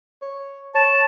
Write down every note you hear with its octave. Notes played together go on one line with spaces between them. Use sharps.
C#5
C#5 A5